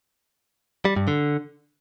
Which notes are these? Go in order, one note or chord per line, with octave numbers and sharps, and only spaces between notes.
G3
G2
D3